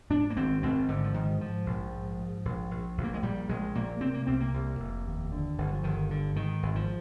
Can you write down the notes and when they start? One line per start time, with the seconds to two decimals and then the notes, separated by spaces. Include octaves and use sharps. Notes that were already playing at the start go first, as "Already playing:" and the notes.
0.10 G#2 D4
0.30 A#3
0.37 G#1 C4
0.63 G#1 C4
0.88 G#2 D3
1.04 F3
1.14 G#2 D#3
1.41 G#2 F3
1.66 A#1
1.93 G#2
2.19 G#2
2.45 A#1
2.71 A#1
2.98 A#1
3.04 A#3
3.14 G#3
3.23 A#2 G3
3.49 A#1 G#3
3.75 A#2 A#3
4.01 C3 C4
4.14 A#3
4.27 C2 C4
4.40 A#3
4.54 C2
4.80 F1
5.06 D#2
5.32 D3
5.58 G1
5.73 F3
5.84 G1 D#3
6.09 G2 D3
6.36 G#2 D#3
6.63 G#1
6.76 F3